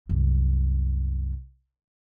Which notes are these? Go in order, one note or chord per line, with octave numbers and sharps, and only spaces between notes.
C2 F#2